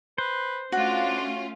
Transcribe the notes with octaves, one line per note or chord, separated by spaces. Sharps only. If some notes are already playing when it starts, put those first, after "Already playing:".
B4 C5
A3 C#4 D4 F4 F#4